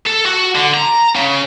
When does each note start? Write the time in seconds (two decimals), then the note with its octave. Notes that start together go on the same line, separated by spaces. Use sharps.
0.07 A4
0.26 F#4
0.55 D3
0.74 A#5
1.15 C#3